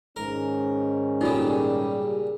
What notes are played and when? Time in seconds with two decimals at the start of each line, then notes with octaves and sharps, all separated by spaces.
0.16 G#2 D#3 C#4 A#4
1.21 A#2 C#3 G3 D#4 F4 A4